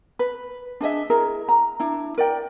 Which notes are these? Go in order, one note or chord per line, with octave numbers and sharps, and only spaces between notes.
B4
D4 G#4 D#5 E5
E4 G#4 A#4
A#5
D4 E4
A#4 D5 G5